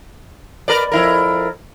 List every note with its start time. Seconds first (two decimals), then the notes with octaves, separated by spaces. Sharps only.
0.68 A#4 B4 D5
0.92 F2 E4 A#4